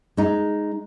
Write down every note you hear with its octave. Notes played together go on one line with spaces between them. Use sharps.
G#3 D#4